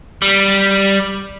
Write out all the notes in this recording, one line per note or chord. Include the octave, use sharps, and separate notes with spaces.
G3